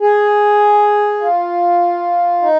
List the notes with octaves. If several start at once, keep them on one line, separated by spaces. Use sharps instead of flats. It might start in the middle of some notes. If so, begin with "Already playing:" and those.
G#4
F4
D#4